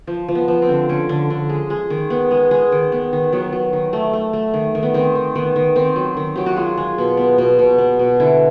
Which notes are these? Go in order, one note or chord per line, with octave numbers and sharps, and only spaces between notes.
F3
F3
B3
F3
C4
D3
D3 C#4
D3
D3
G#3
G#3
D#3
B3
G#3
G#3
D#3
B3
D#3
F#3 B3
F#3
D#3
A3
A3
A3
D#3
D#3
B3
D#3 C4
D#3
D#3 B3
D#3
D#3 C4
F#3
D#3
F#3 G4
F#4
G#3 F4
G#3
B2
B3
B2
B2
B3
B2
D3 E4